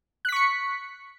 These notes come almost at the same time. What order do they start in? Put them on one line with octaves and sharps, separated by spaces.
F#6 B6 C#6 C#7